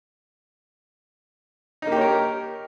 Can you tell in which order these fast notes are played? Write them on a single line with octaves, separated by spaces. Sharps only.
D#4 A#3 G4 C#5 A#4